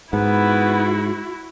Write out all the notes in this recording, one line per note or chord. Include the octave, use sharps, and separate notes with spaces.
G#2 B3 E4 F#4